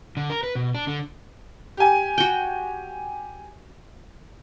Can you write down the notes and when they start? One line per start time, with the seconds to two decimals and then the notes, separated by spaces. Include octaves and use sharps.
0.17 D3
0.30 A#4
0.43 B4
0.55 B2
0.75 D4
0.87 D3
1.77 G4 G#5
2.18 F#4 G5